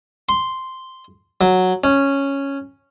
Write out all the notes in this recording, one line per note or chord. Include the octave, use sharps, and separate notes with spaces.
C6
F#3
C#4